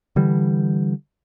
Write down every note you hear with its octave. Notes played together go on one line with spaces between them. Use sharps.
D3 E3 G3